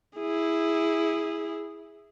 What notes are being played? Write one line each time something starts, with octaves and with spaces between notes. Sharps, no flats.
E4 G#4